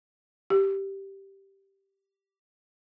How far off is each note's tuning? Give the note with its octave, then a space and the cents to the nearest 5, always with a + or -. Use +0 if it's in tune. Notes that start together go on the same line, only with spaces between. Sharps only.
G4 -5